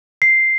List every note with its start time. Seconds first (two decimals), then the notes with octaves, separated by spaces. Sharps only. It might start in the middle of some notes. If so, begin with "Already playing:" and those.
0.22 C7